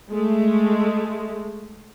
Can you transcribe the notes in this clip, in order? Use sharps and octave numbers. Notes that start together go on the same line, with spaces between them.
G#3 A3